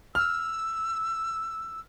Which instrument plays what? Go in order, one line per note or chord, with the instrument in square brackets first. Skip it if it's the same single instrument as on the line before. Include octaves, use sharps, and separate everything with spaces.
[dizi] E6 [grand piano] F6